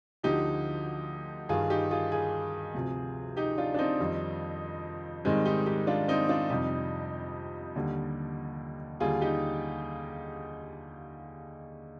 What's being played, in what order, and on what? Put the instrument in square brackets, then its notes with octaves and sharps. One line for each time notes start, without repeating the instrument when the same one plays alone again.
[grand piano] D2 D3 F3 D#4 G4
G2 D#3 G3 F4 G#4
D#4 G4
F4 G#4
F4 G#4
D2 C3 F3
D#4 G4
D4 F4
D4
C4 D#4
F2 D#3 G3
G#2 D#3 G3 G#3 C4
D#4 G4
D#4 G4
D4 F4
C4 D#4
D4 F4
F2 C3 G3 D#4 G4
D#2 D3 G3
D#2 D3 G3 F4 G#4
D#4 G4